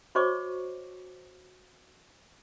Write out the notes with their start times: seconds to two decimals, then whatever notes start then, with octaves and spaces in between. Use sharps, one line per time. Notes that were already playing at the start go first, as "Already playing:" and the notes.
0.15 F#4 C5 C#5 D#5 C#6 D6